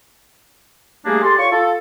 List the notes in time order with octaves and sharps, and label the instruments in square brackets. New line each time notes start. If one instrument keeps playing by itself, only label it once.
[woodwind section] G3 A3 A#3 D4 G#4
G4 A4 D5 C6
F4 C#5 C#6
F4 A4